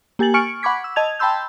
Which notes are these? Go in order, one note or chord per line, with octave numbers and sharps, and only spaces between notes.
A#3 G4 G#5 A6 F#7
G#5 C#6 F6 C#7 D7
F#5 B5 C#6 D6 G#6 B6
E6
D#5 A5 G#6 F7
G5 A5 B5 C6 E6 G6